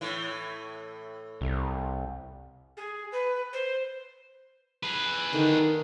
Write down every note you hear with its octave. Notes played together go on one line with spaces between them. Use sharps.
A2 E3
C2
G#4
B4
C5
G#4 B4
D3 D#3